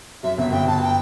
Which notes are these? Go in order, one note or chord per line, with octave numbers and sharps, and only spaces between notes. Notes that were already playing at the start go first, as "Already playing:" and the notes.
F#2 E5
G1 E5
G1 G5
G1 A5
G5